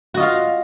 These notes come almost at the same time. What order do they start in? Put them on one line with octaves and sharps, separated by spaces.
F#4 D#5 F4 F5